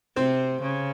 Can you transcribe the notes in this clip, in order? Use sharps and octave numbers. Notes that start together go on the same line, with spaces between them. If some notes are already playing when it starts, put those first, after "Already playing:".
C3 C4 C5
C#3